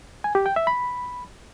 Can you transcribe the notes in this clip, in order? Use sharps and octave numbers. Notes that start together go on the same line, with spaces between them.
G#5
G4
G5
E5
B5